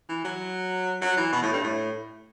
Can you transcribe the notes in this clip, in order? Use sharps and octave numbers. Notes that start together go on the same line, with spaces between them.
E3
F#3
F#3
E3
B2
A2
G2
A2